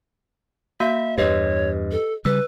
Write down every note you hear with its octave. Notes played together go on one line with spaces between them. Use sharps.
A#3 F#4 E5 F5
E2 G2 G4 B4 C#5 D#5
A4
C#3 G3 B4 E6